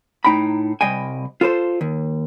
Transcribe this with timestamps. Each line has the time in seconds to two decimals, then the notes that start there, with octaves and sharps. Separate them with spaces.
0.25 A2 D#4 G5 A#5 B5
0.81 C2 F#2 G3 D#5 G5 G#5
1.41 F4 A4 B4 C5
1.81 D#2